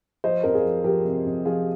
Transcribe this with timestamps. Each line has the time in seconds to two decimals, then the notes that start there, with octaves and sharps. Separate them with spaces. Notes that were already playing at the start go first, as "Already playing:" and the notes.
0.24 F3 C5 D#5
0.43 F2 A#4
0.54 F4 G#4
0.64 F3
0.84 F3 G4 A#4
1.05 C3
1.25 F2
1.45 F3 F4 G#4